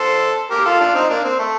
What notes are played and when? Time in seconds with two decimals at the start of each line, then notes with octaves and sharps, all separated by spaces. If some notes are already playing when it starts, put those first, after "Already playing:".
Already playing: A4 C5
0.51 G4 A#4
0.65 F4 A4
0.80 D4 F4
0.95 C4 D#4
1.10 A#3 D4
1.24 C4
1.39 A3